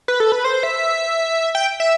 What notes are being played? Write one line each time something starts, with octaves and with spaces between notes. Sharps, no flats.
B4
A4
B4
C5
E5
G5
E5